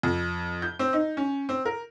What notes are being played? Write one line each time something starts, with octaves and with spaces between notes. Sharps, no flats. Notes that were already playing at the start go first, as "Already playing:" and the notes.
F2
G6
C4
D#4
C#4
C4
A#4